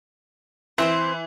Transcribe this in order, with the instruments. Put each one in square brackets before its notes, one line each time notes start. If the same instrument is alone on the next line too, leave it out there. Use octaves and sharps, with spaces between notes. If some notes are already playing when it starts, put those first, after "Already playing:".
[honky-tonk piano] E3 [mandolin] C4 E4 C5